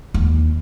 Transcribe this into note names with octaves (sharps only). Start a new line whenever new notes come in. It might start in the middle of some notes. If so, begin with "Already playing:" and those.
D#2